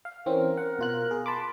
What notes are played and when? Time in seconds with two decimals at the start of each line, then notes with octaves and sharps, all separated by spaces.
0.05 F5
0.26 E3 C4 C#4 A#4
0.57 F#5
0.79 B2 F4 F#6
1.11 G#4
1.26 A5 B5 C6 D6